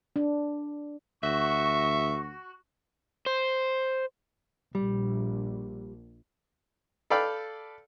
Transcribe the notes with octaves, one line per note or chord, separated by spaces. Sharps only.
D4
D2 F#4 E5 C#6
C5
A#1 G3
A4 B4 D5 F5 G5